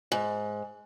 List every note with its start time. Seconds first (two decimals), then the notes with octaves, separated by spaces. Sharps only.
0.12 G#2